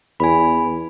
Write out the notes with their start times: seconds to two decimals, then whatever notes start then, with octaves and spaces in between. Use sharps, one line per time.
0.20 E2 G#5 B5